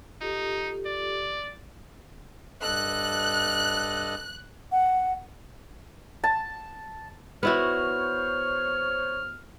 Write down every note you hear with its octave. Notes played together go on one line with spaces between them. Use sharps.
D#4 F4 G4 A4
D5
G2 A4 D#5 F#6
F#5
A5
B3 E4 F#4 C5 C#5 F6